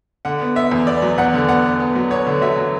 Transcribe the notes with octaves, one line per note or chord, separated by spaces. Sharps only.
D3 F#5
B3
B3 E5
E2
B3 D5
F#3
E2 F#5
D3
B3 F#5
B3
B3
F#3
B3 C#5
D3
F#3 E5
F#3